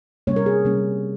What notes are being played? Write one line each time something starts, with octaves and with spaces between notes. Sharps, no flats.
C3 G3 A#3 C#4 C#5
A#4
G#4
C3 G3 A#3 C#4